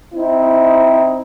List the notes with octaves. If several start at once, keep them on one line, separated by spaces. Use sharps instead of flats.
C4 D#4 E4